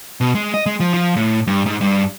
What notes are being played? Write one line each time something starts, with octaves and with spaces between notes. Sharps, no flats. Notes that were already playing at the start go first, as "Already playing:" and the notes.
B2
G#3
D#5
G#3
F3
F3
A2
G2
G#2
G2